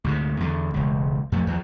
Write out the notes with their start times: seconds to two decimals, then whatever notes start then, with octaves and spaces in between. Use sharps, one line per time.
0.04 D2 G#2 C3
0.40 E2 D3
0.74 E1 C#2
1.32 F2 C3 A3
1.47 E2 E3 F3